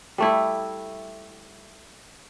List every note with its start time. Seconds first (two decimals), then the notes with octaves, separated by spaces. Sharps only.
0.18 G3 A3 E4